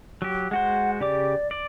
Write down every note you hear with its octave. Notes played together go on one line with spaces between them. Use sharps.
F#3 G4
G#3 F#4 C5 F#5
C#3 G4 D5 D6
D5